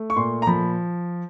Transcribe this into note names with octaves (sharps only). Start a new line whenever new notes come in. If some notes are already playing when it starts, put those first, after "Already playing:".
Already playing: A3
C#6
A#2 C6
A#5
F3 B5